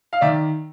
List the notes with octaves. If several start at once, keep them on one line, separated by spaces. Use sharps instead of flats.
F5
D#3 D5 E5